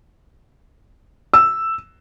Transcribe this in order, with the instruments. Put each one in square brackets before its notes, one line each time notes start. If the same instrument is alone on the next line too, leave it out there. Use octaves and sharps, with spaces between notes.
[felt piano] E6